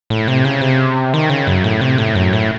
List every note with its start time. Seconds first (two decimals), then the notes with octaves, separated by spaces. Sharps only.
0.10 A2
0.28 C3
0.45 C#3
0.61 C3
1.14 D#3
1.30 C#3
1.47 F#2
1.64 A2
1.81 C3
1.98 A2
2.15 F#2
2.33 A2